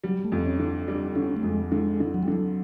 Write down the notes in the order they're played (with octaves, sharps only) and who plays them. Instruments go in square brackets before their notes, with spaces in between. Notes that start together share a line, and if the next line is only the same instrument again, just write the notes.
[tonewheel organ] F#3 [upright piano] G3
[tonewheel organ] A3
[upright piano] F2
[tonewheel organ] C#4
[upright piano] D3
[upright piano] G3 [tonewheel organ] D4
[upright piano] D3 [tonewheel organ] C#4
[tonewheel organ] A3
[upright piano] F2 [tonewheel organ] G#3
[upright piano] D3 [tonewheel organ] G#3
[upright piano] D3
[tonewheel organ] F#3
G3
[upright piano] D3 [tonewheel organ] F#3